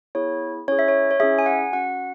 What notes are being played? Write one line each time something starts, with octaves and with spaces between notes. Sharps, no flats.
B3 E4 G#4 C#5
C#4 E4 G#4 C#5
E5
C#5
C#5
C#4 E4 G#4 E5
G#5
F#5
C#4 F#4 F#5